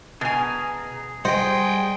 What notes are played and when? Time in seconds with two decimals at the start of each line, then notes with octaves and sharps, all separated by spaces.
0.21 B2 G#4 G#5 A#5
1.25 G3 G#4 C5 D#5 F#5 G5